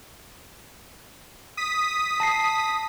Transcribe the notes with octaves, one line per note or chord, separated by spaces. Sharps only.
D#6 B6
A5 A#6 C7